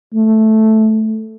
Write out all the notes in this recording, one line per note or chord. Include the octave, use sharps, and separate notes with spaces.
A3